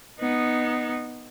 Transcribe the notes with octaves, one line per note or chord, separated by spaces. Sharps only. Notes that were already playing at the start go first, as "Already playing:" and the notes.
B3 D#4